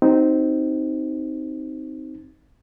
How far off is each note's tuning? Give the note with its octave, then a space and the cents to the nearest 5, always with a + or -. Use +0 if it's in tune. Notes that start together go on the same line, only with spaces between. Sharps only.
C4 +0 D#4 +0 F#4 +45